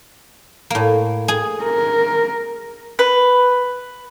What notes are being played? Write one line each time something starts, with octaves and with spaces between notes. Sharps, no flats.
A2 A#3
G#4 G#5
A#4
B4